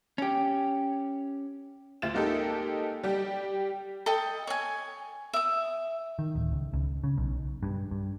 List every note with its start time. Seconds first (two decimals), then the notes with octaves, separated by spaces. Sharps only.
0.18 C#4 G4
2.02 D2 F4 A6 E7
2.14 G#3 A#3 D#4 G4 A4
3.03 G3 G4
4.06 A4 D#5 G5
4.47 C#5 G#5
5.33 E5 D#6
6.19 D#3
6.35 D1
6.52 C#2
6.73 C#2
7.04 C#3
7.17 B1
7.63 G2
7.91 G2